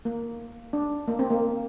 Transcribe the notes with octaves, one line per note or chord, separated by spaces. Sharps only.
A#3
D4
A#3
C4
A#3